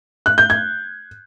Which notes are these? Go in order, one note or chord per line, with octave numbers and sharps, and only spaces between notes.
F#6
G6
G#6